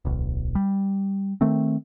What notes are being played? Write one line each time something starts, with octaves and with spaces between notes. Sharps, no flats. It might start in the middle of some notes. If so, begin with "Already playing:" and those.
D1 B1
G3
D#3 A3 C4